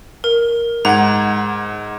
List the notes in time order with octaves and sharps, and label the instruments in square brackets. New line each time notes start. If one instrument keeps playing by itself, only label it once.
[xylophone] A#4
[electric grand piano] G#2 F#5 [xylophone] A#5 G#6